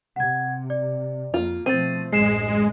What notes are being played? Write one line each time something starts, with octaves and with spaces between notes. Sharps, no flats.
C3 F#5 G#6
D5
F2 A#3 F4
B2 F3 A3 C4 A6 D#7
A1 F#2 D3 G#3 C7 E7